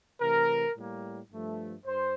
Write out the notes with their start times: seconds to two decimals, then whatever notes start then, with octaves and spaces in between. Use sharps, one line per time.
0.20 C3 E3 A3 A#4
0.76 A2 G3 A#3
1.31 G2 F3 A3
1.86 G2 C5